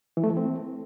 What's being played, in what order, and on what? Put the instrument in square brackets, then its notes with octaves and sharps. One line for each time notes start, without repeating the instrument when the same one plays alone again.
[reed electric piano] E3
A3
E3
C4